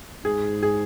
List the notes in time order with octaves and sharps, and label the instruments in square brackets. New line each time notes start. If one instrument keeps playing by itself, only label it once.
[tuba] G#2 [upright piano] G#4
[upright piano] G#4